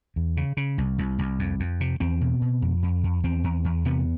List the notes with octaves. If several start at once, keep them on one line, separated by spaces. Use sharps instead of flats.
E2
C#3
C#3
C2
C2
C2
F2
F2
C3
E2 C4
B2
B2
F2
F2
F2
E2 C4
E2
E2
C3 B3